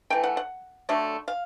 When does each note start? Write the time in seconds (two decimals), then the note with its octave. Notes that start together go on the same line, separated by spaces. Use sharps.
0.10 E3 A3 G5
0.24 F#5
0.37 F#5
0.89 D3 F#3 A3
1.28 F5